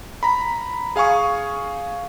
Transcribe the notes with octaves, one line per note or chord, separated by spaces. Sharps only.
A#5 B5
G#4 F5 G#5 C#6 D#6